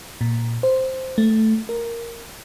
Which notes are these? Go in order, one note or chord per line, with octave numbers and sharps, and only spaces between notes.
A#2
C5
A3
A#4